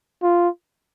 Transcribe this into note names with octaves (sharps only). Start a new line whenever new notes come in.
F4